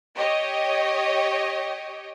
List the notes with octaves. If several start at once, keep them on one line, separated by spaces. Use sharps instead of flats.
G4 C#5 D#5